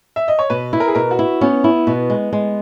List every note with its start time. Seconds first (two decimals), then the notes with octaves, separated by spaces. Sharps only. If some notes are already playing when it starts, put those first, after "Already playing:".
0.16 E5
0.28 D#5
0.39 C#5
0.50 B2 B4
0.73 E4
0.80 A#4
0.88 G#4
0.95 B2 A#4
1.11 F#4
1.19 E4
1.41 B3 C#4
1.64 E4
1.87 B2
2.10 G#3
2.33 G#3